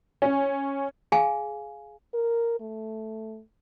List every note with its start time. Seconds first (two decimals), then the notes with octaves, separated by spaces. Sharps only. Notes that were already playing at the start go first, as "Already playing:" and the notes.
0.22 C#4
1.12 G#4 F5 G#5
2.14 A#4
2.60 A3